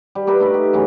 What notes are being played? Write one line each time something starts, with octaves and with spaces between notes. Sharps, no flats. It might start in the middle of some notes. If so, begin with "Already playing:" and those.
G3
G4 A#4 B4 E5
A3 D#4 B4
G4
F#2 C#3 E3 A3